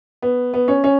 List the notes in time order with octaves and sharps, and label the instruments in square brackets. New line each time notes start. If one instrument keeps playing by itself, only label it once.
[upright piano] B3
B3
C#4
C#4